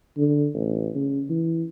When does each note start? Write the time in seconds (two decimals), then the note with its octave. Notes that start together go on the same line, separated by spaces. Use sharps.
0.17 D3
0.54 A1
0.95 C#3
1.30 E3